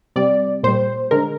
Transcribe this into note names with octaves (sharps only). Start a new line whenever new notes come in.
C3 G3 D5
A#2 G3 C5
D3 G#3 A#4